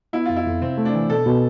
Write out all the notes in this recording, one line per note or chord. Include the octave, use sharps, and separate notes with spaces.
B3 E4
F2 F4
E4
F2
C3 C4
A3
D4
E3
B2 A4
B2